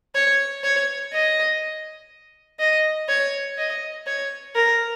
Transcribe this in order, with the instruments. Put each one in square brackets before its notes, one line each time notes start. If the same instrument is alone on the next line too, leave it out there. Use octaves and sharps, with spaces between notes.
[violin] C#5
C#5
D#5
D#5
C#5
D#5
C#5
A#4